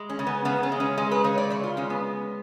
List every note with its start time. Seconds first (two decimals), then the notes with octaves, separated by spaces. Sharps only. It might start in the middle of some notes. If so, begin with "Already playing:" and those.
Already playing: G#3
0.09 C#4
0.19 C#3
0.27 B3
0.45 C#3 B3
0.63 C#4
0.72 G#3
0.80 C#4
0.97 G#3 C#4
1.11 B4
1.24 C#3 C#5
1.38 D5
1.50 C#3 C#5
1.64 F4
1.77 G#3 C#4
1.90 B3